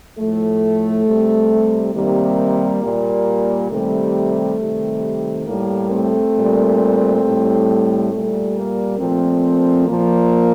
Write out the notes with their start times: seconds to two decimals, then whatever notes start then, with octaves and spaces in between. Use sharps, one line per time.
0.18 A2 F3 A3
1.05 C3 G3
1.94 C3 D#3 G3 A#3
2.82 A#2 G3
3.70 C3 D#3 G3 A3
4.58 C3 D#3 G3
5.46 A2 G3 A#3
5.90 A3 C4
6.35 A#2 G3
7.23 A2 G3
8.11 A#2 G3 A3
8.55 A#3
8.99 A#2 F3 A3 C4
9.87 A#2 F3 A#3